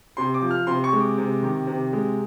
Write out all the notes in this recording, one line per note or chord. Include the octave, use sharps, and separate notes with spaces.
C3 C6
D6
F3
F6
C3 C6
C#6
G#3
D6
C3
D#3
C3
G#3